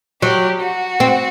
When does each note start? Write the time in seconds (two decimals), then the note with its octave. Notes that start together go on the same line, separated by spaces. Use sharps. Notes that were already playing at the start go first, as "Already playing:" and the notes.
0.22 F#3 G4
0.62 F#4
1.00 C4